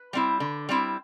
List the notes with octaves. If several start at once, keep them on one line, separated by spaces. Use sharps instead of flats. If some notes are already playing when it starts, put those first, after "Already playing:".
Already playing: B4
G3 C4 E4
D3
G3 C4 E4